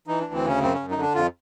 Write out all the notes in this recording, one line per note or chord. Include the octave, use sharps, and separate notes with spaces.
E3 D#4
D2 D4
C4
C#3 C#4
F#2 C4
C#4
F#2
D#4
D3 D4
F2 F4